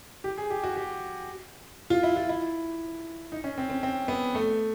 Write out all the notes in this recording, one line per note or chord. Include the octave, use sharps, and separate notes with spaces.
G4
G#4
G4
F#4
G4
F4
E4
F4
E4
D#4
C#4
C4
C4
C4
B3
A3